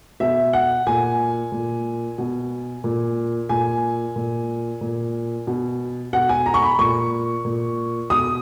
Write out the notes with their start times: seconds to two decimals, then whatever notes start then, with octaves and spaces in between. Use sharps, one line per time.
0.20 B2 E5
0.53 F#5
0.87 A#2 G#5
1.52 A#2
2.18 B2
2.84 A#2
3.49 A#2 G#5
4.16 A#2
4.81 A#2
5.47 B2
6.13 B2 F#5
6.29 G#5
6.46 A#5
6.54 C#6
6.62 B5
6.79 A#2 C#6
7.45 A#2
8.10 B2 D#6